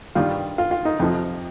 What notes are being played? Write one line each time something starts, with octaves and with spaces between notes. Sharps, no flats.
G2 D#3 G3 F4
F4
F4
D#4
F2 C3 F3